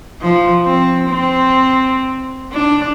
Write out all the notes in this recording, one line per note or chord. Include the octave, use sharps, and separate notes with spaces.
F3
C4
C4
D4